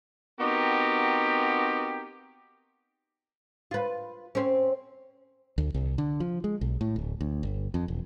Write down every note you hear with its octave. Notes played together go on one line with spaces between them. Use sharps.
B3 C4 D#4 F#4 G4 A#4
F4 B4
C4 C#4
D2
C2
D3
F3
G#3
B1
A2
D1
D2
G1
F2
E1